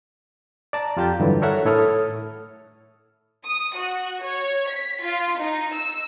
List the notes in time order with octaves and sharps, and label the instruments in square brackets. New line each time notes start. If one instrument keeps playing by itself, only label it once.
[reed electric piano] D5 A5 A#5
F2 F4 G4 A5 A#5 G6
G2 D3 E3 F#3 G3
A4 A#4 C#5 E5 F#5
A2 E4 A4 C#5 D#6 F6
[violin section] D#6
F#4
C#5
B6
F4
D#4
E6